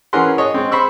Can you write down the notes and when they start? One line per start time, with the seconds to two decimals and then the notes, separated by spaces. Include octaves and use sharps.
0.13 E3 C#4 G#4 A#4 F#5 C6
0.37 G#4 C#5 D#5
0.54 G#3 C4
0.71 C5 B5 C#6 E6